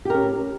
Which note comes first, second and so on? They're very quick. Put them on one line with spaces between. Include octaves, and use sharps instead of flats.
G4 A#4 C#4